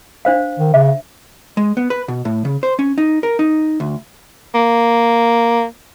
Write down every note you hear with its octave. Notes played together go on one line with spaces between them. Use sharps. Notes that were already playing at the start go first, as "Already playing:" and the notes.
D4 C5 F5
D#3
C#3 E5
G#3
B3
B4
B2
A2
C#3
C5
C#4
D#4
A#4
D#4
D2
A#3